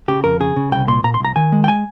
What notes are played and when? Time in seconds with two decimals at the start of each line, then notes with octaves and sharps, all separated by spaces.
0.08 C#3 G4
0.24 F2 A#4
0.40 C#3 G#4
0.56 C#3
0.72 C2 G5
0.88 A#2 C6
1.04 A#2 A#5
1.14 C6
1.20 C2 A#5
1.36 D#3 G#5
1.52 G#3
1.64 G5
1.68 G#5